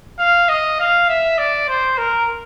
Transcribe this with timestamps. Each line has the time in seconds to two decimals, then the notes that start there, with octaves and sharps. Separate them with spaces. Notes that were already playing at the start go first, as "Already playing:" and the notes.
0.19 F5
0.49 D#5
0.80 F5
1.09 E5
1.38 D5
1.68 C5
1.98 A#4